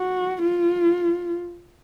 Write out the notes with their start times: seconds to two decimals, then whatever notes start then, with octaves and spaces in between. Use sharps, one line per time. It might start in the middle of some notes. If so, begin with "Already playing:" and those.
Already playing: F#4
0.42 F4